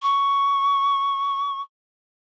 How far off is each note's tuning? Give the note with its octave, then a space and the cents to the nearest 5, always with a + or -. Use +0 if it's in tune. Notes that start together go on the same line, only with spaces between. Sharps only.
C#6 +10